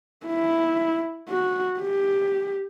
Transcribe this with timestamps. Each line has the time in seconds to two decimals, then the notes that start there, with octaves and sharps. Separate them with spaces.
0.26 E4
1.29 F#4
1.80 G4